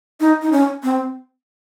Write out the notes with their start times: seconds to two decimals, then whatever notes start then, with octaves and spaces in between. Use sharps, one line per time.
0.20 D#4
0.42 D#4
0.52 C#4
0.83 C4